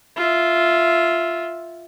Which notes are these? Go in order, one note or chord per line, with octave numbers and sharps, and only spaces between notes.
F4 E5